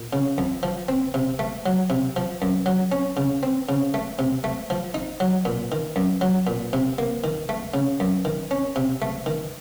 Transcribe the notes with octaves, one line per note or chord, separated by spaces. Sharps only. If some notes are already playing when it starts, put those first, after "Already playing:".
Already playing: A#2
C#3
F2
F3
C4
C3
A3
F#3
C3
F3
F#2
F#3
C#4
C#3
C4
C#3
A3
C3
A3
F3
D#4
F#3
A#2
D#3
F#2
F#3
A#2
C3
A#3
D#3
A3
C#3
F#2
D#3
C#4
C3
A3
D#3